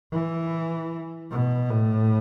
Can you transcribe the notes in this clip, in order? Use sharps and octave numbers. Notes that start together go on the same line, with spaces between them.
E3
B2
A2